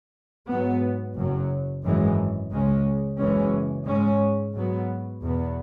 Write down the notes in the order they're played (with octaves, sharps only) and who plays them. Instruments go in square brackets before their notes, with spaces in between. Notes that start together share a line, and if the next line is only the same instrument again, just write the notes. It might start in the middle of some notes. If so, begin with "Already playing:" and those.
[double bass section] G#2 F#3 B3
F#1 F#2 F#3
G#1 F#2 E3 G#3
C#2 C#3 G#3 C#4
F#1 F#2 E3 G#3 C#4
G#2 G#3 C#4
G#2 F#3 B3
E2 B2 B3